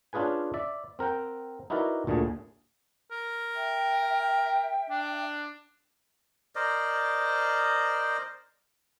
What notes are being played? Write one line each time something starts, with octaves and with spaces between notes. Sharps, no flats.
C#4 D4 F4 G#4 B4 G#5
D5 E5
C4 A#4 F#5 G5
D#4 E4 F#4 A#4 B4 D5
D2 A#2 D3 A3 G#4
A#4
E5 G5
D4
A#4 C5 D5 D#5